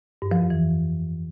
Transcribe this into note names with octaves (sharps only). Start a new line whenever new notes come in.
G2
F3
F2
E3